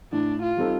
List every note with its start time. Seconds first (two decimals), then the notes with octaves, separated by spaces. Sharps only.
0.12 A2 D4
0.43 F4
0.57 G3 C4 D#4 A4